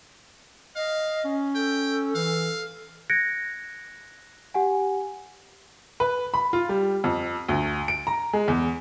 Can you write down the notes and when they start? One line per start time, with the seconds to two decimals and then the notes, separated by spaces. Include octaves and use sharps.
0.76 D#5 F5
1.25 C#4
1.55 A4 G5
2.15 E3 F5
3.10 F#6 G#6 A#6 C#7 D7
4.54 G4 F#5 G#5
6.00 B4
6.34 B5
6.53 F4
6.69 G3
7.04 F2
7.49 D2
7.88 D7
8.07 A#5
8.33 G#3
8.48 E2